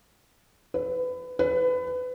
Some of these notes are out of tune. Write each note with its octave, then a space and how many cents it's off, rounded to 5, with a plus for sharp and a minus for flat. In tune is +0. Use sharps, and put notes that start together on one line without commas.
B4 +25
B4 +25